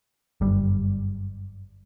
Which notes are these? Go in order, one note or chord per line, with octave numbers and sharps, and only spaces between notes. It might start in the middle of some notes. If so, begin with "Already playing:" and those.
G1 F#2 G3